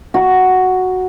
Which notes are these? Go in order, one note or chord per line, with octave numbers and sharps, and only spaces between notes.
F#4 A#5